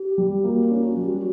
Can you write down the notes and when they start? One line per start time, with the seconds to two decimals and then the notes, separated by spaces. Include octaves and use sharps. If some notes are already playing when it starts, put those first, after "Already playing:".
Already playing: G4
0.18 G3
0.44 A#3 F#4
0.71 C#4
0.97 G3